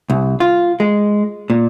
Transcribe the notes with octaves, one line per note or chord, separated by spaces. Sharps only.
C2
F4
G#3
A#2